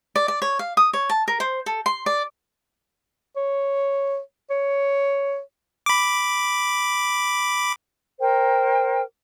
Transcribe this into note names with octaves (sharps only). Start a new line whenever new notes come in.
D5
D5
C#5
F5
D#6
C#5
A5
A#4
C5
A4
C6
D5
C#5
C#5
B5 D6
A#4 C5 G5